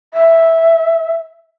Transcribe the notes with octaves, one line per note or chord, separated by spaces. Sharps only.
E5